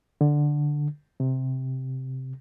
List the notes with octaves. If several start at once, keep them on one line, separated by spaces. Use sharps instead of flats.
D3
C3